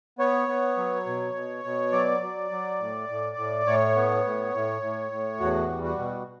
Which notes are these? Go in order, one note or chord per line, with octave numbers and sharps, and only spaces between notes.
B3 C#5
B3
F#3
B2
B2
B2
F#3 D5
F#3
F#3
A2
A2
A2
A2 C#5
B3
A2
A2
A2
A2
E2 F#4
G3
F#4
B2